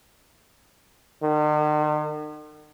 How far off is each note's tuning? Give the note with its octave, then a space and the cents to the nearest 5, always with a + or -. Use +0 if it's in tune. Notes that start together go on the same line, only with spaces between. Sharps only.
D#3 -45